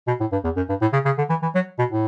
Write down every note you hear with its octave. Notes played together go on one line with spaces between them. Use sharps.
B2
A2
G2
E2
F#2
G2
A2
C#3
C#3
D3
E3
E3
F#3
B2
A2